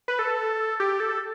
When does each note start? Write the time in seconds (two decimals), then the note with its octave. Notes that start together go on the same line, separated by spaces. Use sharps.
0.08 B4
0.19 A4
0.80 G4
1.00 A4